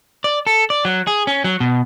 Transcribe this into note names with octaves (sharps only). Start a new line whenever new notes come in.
D5
A4
D5
F#3
G#4
C#4
F#3
B2